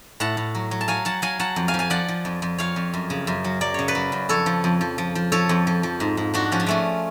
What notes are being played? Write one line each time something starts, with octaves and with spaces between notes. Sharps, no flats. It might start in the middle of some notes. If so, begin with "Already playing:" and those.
A2 F#5 A5
A2
F#3
F#3
A5
F#3 F5 G#5
F#3 F#5 A5
F#3 F5 G#5
F#3 F#5 A5
F2
F5 G#5
F3
F5 G#5
F3 D5 F#5
F3
F2
F2
F2 C#5 F5
F2
F#2
C#3
F#2
F#3
F#3 D5
C#3 C#5
B4 D5
F#3
F#2
F2 A4 C#5
F3
F2
F3
F3
F3
F3 A4 C#5
F2
F3
F3
G#2
G#2
G#2 D4 F#4
F3 C#4
D4
F3 A3 C#4